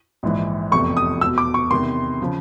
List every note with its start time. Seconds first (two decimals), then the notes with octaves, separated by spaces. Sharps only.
0.23 A#1 G#2 E3
0.71 F1 E2 C3 C#6
0.97 D#6
1.21 E2 E6
1.25 B2
1.38 D6
1.54 C#6
1.71 E2 C3 D#3 C6
2.22 C#3 F3